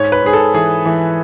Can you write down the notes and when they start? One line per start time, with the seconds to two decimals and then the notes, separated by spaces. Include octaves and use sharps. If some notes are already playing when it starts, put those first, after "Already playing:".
Already playing: G#2 C#5
0.12 B4
0.22 G#2 G#4
0.33 A4
0.54 E3 G#4
0.85 E3